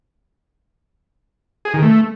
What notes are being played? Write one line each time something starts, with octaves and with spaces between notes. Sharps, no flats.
G#4
D#3
A3